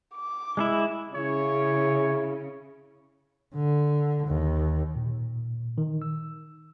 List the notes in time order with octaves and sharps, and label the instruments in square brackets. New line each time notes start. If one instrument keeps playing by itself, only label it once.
[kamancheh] D6
[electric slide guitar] G#3 D#4 E4
[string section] C#3 [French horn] E4 [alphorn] G#4 [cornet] C#5
[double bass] D3
D#2
[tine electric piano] A#2
D#3
E6